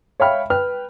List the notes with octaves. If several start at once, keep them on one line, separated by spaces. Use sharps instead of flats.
C#5 E5 F5 G5 B5 F6
B4 G5 F6